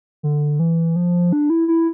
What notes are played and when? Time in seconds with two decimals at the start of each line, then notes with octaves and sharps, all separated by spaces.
0.23 D3
0.59 E3
0.96 F3
1.32 D4
1.50 E4
1.68 E4